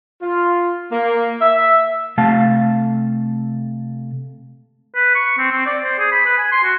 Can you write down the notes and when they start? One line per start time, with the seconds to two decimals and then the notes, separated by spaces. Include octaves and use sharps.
0.22 F4
0.92 A#3
1.42 E5
2.18 C3 A3 F5 A5
4.95 B4
5.15 C#6
5.38 C4
5.51 C4
5.66 D5
5.84 C5
5.99 G#4
6.12 B5
6.26 B4
6.38 G#5
6.52 C6
6.64 F#4